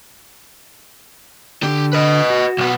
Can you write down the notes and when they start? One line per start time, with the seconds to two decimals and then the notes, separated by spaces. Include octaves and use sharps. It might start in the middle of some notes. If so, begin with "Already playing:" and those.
1.63 D3 G4
1.93 B4 D#5
2.30 F#4
2.58 B1 B3